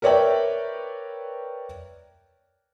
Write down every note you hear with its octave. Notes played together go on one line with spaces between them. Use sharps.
A#4 B4 C#5 D5 E5 G5